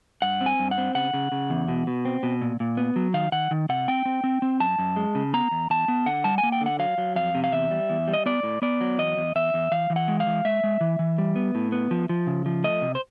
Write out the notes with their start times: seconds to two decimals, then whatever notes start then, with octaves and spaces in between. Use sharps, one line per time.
0.22 G2 F#5
0.41 C4
0.46 G#5
0.59 G2
0.71 F#5
0.78 C4
0.95 C#3 F#5
1.14 C#3
1.32 C#3
1.50 E2
1.68 B2
1.87 B2
2.05 C4
2.23 B2
2.42 A#2
2.60 A#2
2.77 B3
2.96 F#3
3.14 D#3 F5
3.32 D#3 F#5
3.51 D#3
3.69 C3 F#5
3.88 C4 G5
4.05 C4
4.24 C4
4.42 C4
4.60 F#2 A5
4.79 F#2
4.96 G#3
5.15 C#3
5.34 B3 A#5
5.51 E2
5.70 E2 A5
5.88 B3
6.06 D3 F#5
6.24 G3 A5
6.38 G#5
6.43 A#3
6.52 G5
6.61 D3
6.66 F#5
6.79 F#3 F5
6.98 F#3
7.16 F2 F5
7.35 C3
7.44 F5
7.52 E2 E5
7.71 G3
7.90 E2
8.08 G3
8.13 D#5
8.26 B3 D5
8.43 A2
8.62 B3 D5
8.81 F#3
8.99 E2 D#5
9.17 E2
9.36 E2 E5
9.54 E2
9.72 E3 F5
9.90 E3
9.96 F#5
10.08 G#3
10.20 F5
10.27 E3
10.45 G#3 E5
10.64 G#3
10.81 E3
10.99 E3
11.18 G3
11.36 B3
11.55 A2
11.72 B3
11.91 F3
12.09 F3
12.27 C#3
12.46 F3
12.64 A3 D#5
12.82 C3
12.95 C5